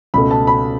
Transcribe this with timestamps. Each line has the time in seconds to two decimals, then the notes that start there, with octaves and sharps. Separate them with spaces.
0.14 C#2 B2 A3 B5
0.31 A5
0.47 B5